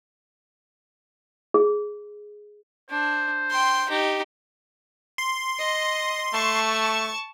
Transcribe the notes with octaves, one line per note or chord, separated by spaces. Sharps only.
G#4
D4 C5
G5 C6
D#4 G4
C6
D#5
A3 A5 C#6